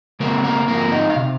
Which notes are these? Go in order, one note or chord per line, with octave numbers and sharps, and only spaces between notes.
C#3 G#3 A#3 C4 A#4
A#3 A#4
G#2 F3 A#3 C4 A#4
D#4 D#5
F5
C3